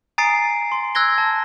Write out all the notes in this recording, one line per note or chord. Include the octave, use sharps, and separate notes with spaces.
G#5 A#5 D#6 A6 C7 D7
C6
E6 F#6 G#6 A#6 G7
A5